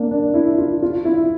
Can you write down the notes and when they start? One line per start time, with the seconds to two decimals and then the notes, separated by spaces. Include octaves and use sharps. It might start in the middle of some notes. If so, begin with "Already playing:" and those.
Already playing: A#3 D4
0.11 D4
0.34 E4
0.58 F4
0.82 F4
1.05 E4